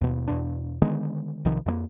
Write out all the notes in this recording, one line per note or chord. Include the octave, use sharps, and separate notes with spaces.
D#2 B2
E2 B2 D4
D3 D#3 G#3 B3
B1 C3 D#3 F3
F2 E3 A#3